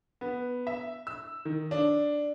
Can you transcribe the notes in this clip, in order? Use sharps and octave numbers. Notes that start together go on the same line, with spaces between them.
B3
E5
E6
D#3
D4